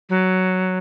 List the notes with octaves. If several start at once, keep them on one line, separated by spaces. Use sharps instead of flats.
F#3